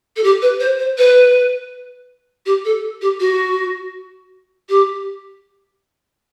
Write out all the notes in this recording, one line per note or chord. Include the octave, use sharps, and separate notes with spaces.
A4
G4
B4
C5
C5
B4
G4
A4
G4
F#4
G4